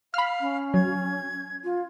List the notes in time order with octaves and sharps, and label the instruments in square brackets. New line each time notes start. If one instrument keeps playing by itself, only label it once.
[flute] F5 [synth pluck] B5 F6
[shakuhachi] C#4
[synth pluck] F#3 [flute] G#6
[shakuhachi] F4